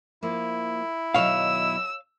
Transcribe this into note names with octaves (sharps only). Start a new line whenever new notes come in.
F3 A#3 E4
B2 D#3 F#3 C#5 F5 E6